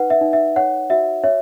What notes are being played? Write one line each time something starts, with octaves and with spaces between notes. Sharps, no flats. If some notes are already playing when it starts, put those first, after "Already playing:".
Already playing: D#4 B4 F#5
E5
D#4
E5
C#5 F#5
F#4 E5
C#5 E5